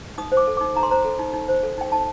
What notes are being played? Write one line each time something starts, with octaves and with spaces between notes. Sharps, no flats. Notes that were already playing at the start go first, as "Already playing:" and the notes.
D#4 D#6
C5
D6
A4
D#4 D6
D#4 A#5
C6
C5 A#5
A4
D#4
D#4
C5
A4
D#4 G5
D#4 A5